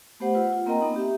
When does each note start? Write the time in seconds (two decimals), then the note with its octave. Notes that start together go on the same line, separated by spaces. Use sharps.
0.20 A3 B3 G4 C5 F#5
0.35 F4 B4 F#5 E6
0.53 F4
0.66 A#3 C4 A#4 D#5 G5 A#5
0.81 B3 D#4
0.96 G4 E5